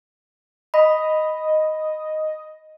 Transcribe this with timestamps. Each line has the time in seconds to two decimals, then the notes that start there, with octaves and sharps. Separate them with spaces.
0.74 D#5 B5